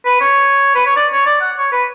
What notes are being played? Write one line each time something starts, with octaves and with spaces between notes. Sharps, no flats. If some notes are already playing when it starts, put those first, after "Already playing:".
B4
C#5
B4
C#5
D5
C#5
D5
F#5
C#5
B4